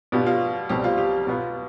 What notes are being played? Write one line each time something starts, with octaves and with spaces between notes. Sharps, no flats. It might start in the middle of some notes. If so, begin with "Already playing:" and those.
B2 B3 D4 F4 G4
F4
C2 B2 G3 C4 G4
F4
G4
B2 B3 F4